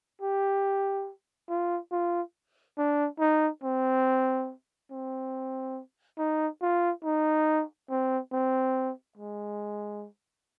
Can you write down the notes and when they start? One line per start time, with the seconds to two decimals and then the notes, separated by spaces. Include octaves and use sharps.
0.22 G4
1.49 F4
1.92 F4
2.78 D4
3.19 D#4
3.63 C4
4.91 C4
6.18 D#4
6.62 F4
7.04 D#4
7.90 C4
8.32 C4
9.18 G#3